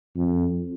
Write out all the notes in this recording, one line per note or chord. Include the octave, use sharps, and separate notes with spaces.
F2